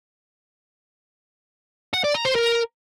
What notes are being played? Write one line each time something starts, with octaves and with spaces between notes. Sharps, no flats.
F#5
D5
A#5
C5
A#4